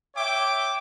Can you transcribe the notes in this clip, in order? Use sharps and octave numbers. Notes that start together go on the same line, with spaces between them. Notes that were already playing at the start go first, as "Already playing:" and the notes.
C#5 E5 G5 D6